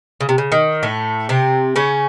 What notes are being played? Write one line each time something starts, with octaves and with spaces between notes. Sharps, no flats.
C#3
C3
C#3
D#3
A2 A3
C3 C4
C#3 C#4